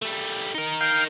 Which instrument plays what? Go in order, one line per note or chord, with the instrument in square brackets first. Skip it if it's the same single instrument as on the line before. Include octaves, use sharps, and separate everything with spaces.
[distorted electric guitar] G3 A3
D#4 A#4
[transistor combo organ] F5 G5